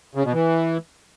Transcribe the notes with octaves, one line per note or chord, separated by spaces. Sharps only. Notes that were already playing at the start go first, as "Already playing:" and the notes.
C#3
B2
E3